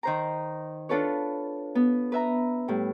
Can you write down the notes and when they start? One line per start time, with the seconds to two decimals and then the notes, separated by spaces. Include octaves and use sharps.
0.03 D#3 C5 A#5
0.89 D4 F4 A4 B4 C#5
1.75 B3
2.12 B4 E5 A#5
2.68 A2 G3